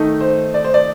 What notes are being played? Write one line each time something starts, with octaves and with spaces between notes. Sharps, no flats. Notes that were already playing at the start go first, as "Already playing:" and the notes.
Already playing: D#3 A3 D#4
C5
D5
C5
D5